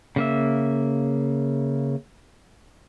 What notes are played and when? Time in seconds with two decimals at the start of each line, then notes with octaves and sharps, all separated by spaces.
0.16 C#3 A#3 E5